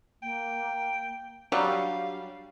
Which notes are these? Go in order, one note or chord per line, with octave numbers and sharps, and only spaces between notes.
A#3 G5
F#3 G3 D4 F5